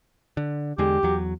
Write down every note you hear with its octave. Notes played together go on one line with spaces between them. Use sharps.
D3
E2 D3 G#3 G4
E2 F#3